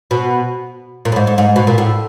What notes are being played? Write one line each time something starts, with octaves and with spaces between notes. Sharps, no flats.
B2
A#2
A2
G#2
G#2
G#2
B2
A#2
A2